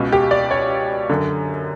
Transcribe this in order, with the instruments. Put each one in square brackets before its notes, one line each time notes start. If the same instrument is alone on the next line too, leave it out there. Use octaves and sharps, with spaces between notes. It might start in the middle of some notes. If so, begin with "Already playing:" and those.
Already playing: [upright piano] C#2 B2
G4
D5
C#5
F#2 D3